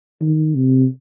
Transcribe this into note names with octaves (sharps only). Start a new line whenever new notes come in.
D#3
C3